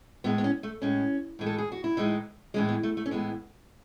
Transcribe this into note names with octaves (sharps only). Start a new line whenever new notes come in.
A2 G#3 B3
B3
C#4
A3
A2 G#3 C#4
A2 E3 G#3
A4
G#4
F#4
E4
A2 E3 G#3 D#4
A2 E3 G#3 C#4
B3
A3
A3
C#4
A2 E3 G#3 B3